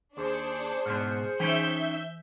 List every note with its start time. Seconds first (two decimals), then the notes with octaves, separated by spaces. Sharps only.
0.17 D#2 D4 G#4 C5 C#7
0.86 G#2 B2 C6 F6
1.40 E3 C#4 D#4 E5 G5 G6